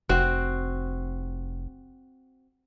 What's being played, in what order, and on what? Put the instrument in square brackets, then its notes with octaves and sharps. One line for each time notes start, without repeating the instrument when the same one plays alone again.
[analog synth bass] F1 [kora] C4 F#4